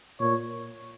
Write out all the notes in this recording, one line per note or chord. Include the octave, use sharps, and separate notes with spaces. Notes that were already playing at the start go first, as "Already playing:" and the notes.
A#2 C#5